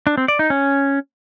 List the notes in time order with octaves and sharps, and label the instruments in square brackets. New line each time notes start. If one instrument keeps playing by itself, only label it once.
[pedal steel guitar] D4
C4
D5
D#4
C#4